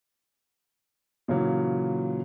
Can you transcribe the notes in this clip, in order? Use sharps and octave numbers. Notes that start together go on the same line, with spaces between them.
A#2 C#3 E3 F#3